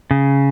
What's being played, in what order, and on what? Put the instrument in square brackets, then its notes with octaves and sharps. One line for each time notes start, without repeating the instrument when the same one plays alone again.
[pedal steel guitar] C#3